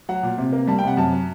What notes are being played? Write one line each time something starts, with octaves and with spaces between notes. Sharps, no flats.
F#3 F#5
A#2
C3
A#3
G3 A5
G5
C3 F#5
F#2 A5
F#3